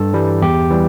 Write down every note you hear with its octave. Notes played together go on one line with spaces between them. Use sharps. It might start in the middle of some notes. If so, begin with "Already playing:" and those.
Already playing: G2 A4
E3 G3
E2 G4
E3 G3